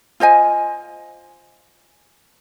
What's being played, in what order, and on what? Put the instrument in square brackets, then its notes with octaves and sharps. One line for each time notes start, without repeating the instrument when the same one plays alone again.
[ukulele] F4 C5 D#5 G#5